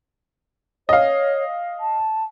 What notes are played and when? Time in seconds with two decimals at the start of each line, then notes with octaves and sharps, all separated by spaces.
0.89 C#5 D#5 F5
1.80 A5